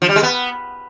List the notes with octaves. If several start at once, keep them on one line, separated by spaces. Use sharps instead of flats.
F3
G3
G#3
B3